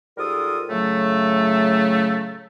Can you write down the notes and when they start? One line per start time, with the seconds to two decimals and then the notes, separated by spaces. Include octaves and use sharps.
0.18 G#2 G3 F4 A4 A#4 D#6
0.69 A2 C#3 F#3 A3